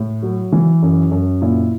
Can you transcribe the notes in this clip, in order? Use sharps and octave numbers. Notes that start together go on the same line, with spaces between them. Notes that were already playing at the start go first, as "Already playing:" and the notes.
Already playing: A2
F#3
E3
F#2
F#2
A#2 E4